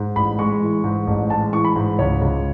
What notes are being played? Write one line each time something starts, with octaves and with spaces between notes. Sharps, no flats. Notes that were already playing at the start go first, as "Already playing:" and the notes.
Already playing: G#2
A1 B5
G#3 C#6
E3
G#2
A1
G#3 A5
E3 C#6
B5
G#2
C#2 C#5
C#2